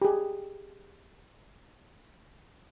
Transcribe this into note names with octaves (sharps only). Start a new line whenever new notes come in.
G4 G#4